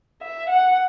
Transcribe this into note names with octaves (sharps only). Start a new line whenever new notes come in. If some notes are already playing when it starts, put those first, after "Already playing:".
E5
F#5